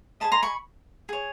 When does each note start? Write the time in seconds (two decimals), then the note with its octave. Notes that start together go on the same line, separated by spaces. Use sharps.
0.20 G#4 C5 D#5 A5 B5
0.32 A#5 C6
0.42 B5 C#6
1.09 G#4 C#5